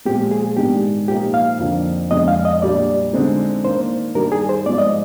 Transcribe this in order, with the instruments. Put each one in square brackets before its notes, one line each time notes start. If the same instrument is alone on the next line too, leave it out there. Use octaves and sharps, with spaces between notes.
[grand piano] A#2 F3 G#3 [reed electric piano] G4
[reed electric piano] G#4
[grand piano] G#2 D#3 G#3 D4 [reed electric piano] G4
[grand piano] A#2 F3 A#3 D#4 [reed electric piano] G4
[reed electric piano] F5
[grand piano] F2 D3 F3 A#3 D4
[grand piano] F2 D3 G#3 D4 [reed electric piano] D#5
[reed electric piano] F5
D#5
[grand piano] A#2 G3 D4 [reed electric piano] D5
[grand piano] D3 G#3 C4 D#4
[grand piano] D#3 A#3 D4 [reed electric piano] C5
[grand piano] G2 D#3 G3 D4 [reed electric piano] A#4
[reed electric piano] G#4
C5
[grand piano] G#2 F3 G#3 [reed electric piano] D5
[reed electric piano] D#5